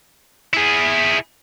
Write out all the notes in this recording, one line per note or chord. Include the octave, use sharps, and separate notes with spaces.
E4 G#4